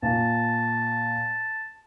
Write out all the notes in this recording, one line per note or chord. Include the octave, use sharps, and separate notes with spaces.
A#2 A5